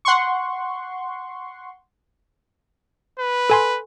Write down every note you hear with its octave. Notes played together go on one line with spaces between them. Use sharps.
F#5 C6 C#6
B4
A4 G#5 C6